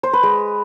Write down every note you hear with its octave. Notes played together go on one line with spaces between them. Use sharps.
C5
B4
G#3